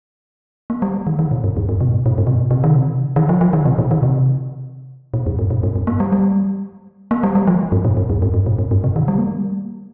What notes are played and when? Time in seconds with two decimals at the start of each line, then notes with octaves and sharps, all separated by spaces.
0.70 A#3
0.82 G3
1.07 D#3
1.19 D#3
1.31 A#2
1.44 G2
1.57 F2
1.69 G2
1.80 C3
1.87 A#2
1.93 G2
2.06 A#2
2.18 G2
2.27 C3
2.34 A#2
2.51 C3
2.64 D#3
2.76 C3
3.16 D#3
3.29 F3
3.41 F3
3.53 D#3
3.66 C3
3.78 A#2
3.91 D#3
4.03 C3
5.14 A#2
5.26 F2
5.39 G2
5.50 A#2
5.63 G2
5.76 G2
5.87 A#3
6.00 G3
6.12 G3
7.11 A#3
7.23 G3
7.35 G3
7.47 F3
7.72 G2
7.85 A#2
7.97 G2
8.10 F2
8.22 G2
8.34 G2
8.46 A#2
8.59 G2
8.71 G2
8.84 C3
8.96 D#3
9.08 G3
9.18 A#3
9.29 G3